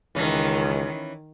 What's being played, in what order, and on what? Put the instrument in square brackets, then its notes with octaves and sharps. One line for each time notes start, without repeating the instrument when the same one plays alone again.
[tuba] C#2 [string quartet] D#3 [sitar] E3 C#4